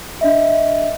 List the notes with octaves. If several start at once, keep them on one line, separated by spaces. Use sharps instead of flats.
D4 D#5 E5